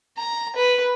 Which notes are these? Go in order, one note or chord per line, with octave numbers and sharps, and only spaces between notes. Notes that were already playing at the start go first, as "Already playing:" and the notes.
A#5
B4